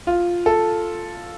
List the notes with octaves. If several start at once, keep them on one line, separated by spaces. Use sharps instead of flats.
F4
A4